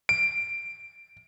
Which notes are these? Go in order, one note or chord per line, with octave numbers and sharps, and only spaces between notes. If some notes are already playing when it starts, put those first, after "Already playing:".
D7